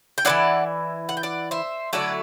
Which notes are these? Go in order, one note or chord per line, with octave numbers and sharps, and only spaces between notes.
G5
E3 B3 E4 D5 F#5
F#5
G5
D5 F#5
C5 E5
D3 F#3 A3 E4 D5 F#5